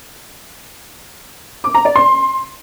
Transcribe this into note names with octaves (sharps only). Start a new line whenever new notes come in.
D6
A#5
D5
C6